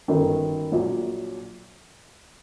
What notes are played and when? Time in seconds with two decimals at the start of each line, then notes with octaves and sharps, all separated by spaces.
0.08 G1 F#2 D#3
0.72 A#1 A#2 F#3